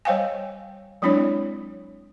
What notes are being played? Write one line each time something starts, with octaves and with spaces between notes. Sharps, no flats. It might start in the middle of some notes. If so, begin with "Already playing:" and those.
G3 C5 C#5 F5 G5 G#5
F#3 G#3 C4 D4 E4 C#5